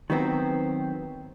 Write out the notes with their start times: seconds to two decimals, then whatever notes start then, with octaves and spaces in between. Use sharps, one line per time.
0.10 D#3 F#3 B3 C4